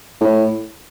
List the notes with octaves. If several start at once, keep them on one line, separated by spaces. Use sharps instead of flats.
A2